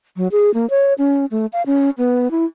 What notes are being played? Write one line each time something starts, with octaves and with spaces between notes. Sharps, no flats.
F#3
G#4
A#3
C#5
C#4
A3
F5
C#4
B3
E4